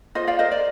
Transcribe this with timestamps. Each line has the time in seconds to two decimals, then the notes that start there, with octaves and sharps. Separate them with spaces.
0.15 F4 C5 D#5
0.27 D5 F5
0.39 A#4 C5 D#5
0.51 D5